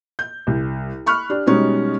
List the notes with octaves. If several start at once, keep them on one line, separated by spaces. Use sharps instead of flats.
G6
C2
B5 C#6 F6 F#6
D4 G4
B2 G3 G#3 C#4 D#4